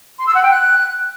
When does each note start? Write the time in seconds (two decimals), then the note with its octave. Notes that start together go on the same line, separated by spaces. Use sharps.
0.19 C6
0.27 E6
0.35 F#5
0.43 G5
0.51 F#6